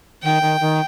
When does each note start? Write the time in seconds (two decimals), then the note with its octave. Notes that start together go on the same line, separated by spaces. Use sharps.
0.23 D#3 G5
0.42 D#3
0.60 D#3